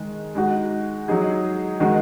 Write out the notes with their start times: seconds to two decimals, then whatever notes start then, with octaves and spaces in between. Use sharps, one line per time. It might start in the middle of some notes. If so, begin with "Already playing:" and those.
Already playing: D#3 G#3
0.35 G#3 D#4 F#4
1.08 F#3 D#4 G#4
1.80 D#3 G#3 D#4 F#4